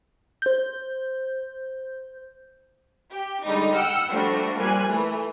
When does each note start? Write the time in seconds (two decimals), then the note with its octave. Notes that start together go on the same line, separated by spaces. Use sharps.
0.42 C5 G6
3.14 G4
3.44 D3 G3 G#3 D#4
3.73 F#5 G5 E6 F6
4.11 F3 G3 A3 D4 F#4
4.57 A#2 F3 G3 G#5 F#6
4.89 E3 A3